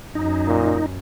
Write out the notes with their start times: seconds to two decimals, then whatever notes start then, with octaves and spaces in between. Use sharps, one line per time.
0.15 F#2 D#4
0.47 A#2